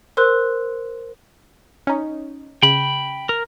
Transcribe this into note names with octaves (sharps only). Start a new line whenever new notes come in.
A#4 C5 C6 E6 F#6
C#4 D#4
C#3 G5 B5
A#4